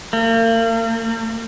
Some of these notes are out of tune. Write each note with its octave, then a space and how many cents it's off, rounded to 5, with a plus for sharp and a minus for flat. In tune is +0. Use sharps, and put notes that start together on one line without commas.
A#3 -40